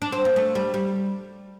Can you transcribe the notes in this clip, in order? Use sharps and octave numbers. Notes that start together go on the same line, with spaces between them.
D4
C4
A#3
A3
G3
G3